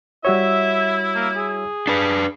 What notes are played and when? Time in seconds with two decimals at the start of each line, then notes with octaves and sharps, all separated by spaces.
0.25 G3 E4 F#4 C#5 E5
1.15 A#3
1.36 G#4
1.87 D4 B4